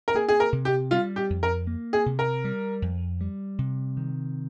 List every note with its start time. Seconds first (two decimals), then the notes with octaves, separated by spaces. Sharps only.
0.08 A#4
0.14 A#3 G#4
0.29 G#4
0.40 A#4
0.53 C3
0.65 G4
0.91 G3 F4
1.16 G4
1.30 F2
1.43 A#4
1.67 A#3
1.93 G#4
2.06 C3
2.19 A#4
2.44 G3
2.82 F2
3.21 G3
3.59 C3
3.97 D#3